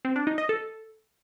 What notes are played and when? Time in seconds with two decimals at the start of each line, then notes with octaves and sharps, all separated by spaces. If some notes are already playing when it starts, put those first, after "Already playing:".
0.05 C4
0.16 D4
0.27 D#4
0.38 D#5
0.49 A4